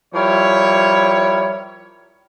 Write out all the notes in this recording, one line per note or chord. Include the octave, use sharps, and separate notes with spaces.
F3 G3 E4 A#4 C#5